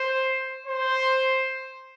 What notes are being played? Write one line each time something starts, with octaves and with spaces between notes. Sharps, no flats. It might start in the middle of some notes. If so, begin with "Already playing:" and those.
Already playing: C5
C5